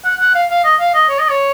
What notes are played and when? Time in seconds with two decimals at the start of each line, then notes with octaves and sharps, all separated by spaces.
0.05 F#5
0.20 F#5
0.34 F5
0.50 F5
0.64 D#5
0.80 F5
0.94 D#5
1.09 C#5
1.19 D#5
1.30 C#5